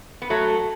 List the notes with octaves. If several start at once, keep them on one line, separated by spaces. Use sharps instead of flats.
B3
F#3 A3